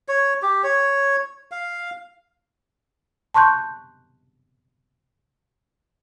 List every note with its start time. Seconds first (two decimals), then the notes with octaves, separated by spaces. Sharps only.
0.08 C#5
0.42 G4
0.64 C#5
1.51 F5
3.34 A5 C6 C#6 F#6 G6